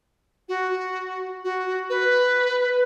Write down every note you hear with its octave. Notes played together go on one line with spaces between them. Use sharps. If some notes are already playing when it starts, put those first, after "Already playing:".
F#4
F#4
B4